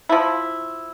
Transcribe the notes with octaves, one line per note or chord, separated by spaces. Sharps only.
F3 E4